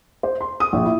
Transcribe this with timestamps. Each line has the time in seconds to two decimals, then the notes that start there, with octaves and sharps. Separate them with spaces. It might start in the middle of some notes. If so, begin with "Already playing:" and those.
0.23 C5
0.41 C6
0.60 D#6
0.73 A#1
0.85 E4